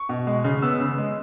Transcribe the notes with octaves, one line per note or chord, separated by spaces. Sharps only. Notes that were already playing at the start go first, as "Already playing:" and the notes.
Already playing: C#6
B2
G#3
C#3
B3 E6
C#3
G#3